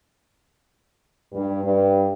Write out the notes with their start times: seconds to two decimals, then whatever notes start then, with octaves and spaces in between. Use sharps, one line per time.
1.33 G2
1.63 G2